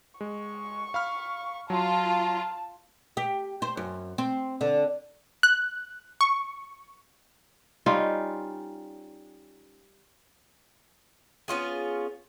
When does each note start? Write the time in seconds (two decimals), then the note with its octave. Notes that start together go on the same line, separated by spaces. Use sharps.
0.21 G#3 C#6
0.94 F5 B5 F6
1.70 F#3 F4 A5
3.17 G4
3.62 C5
3.77 F#2
4.18 C4
4.61 D3
5.43 F#6
6.21 C#6
7.86 G3 C#4 D#4 F4
11.48 B3 C#4 F4 G#4